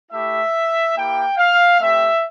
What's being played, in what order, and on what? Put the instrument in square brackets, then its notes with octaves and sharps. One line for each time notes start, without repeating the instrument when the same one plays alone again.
[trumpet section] A3 E4 G4 E5
A#3 E4 G4 G5
F5
A3 C4 G4 E5